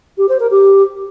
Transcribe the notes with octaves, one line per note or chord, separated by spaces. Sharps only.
G4
C5
A#4
G4